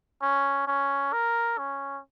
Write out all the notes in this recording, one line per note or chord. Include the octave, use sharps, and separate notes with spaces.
C#4
C#4
A#4
C#4